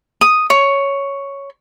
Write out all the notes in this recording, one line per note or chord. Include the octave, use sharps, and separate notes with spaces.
D#6
C#5